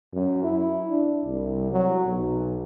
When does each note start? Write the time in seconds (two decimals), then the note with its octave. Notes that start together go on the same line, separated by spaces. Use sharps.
0.13 F#2
0.43 E4
0.89 D4
1.24 C2
1.72 F#3
2.06 B1